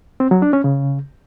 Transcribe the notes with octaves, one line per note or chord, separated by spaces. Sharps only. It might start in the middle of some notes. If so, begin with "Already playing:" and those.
C4
F#3
D4
C#4
C#3